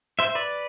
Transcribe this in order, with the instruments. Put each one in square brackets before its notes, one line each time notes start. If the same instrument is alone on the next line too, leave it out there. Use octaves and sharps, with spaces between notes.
[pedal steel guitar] C5 E5
B4 D5